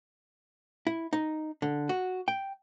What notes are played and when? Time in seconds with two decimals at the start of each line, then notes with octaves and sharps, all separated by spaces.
0.87 E4
1.13 D#4
1.62 D3
1.89 F#4
2.28 G5